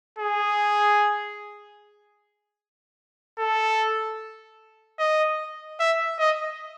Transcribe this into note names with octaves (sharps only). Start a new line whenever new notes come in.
G#4
A4
D#5
E5
D#5